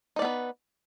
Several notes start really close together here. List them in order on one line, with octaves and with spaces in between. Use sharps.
D#4 D5 B3 B4